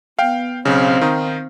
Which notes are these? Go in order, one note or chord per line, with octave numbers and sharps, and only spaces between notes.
B3 F5 G5
B1 C#3 C4 F5
D#3 D#4